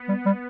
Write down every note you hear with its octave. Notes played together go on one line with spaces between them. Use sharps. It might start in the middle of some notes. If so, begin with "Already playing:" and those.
Already playing: B3
G3
G3